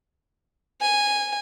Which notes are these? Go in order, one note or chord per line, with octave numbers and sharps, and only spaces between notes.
G#5